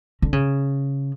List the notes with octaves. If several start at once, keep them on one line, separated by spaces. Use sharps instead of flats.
D3
C#3